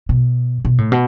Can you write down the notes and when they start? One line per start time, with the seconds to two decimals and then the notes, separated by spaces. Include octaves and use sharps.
0.09 B2
0.65 B2
0.78 A2
0.92 B2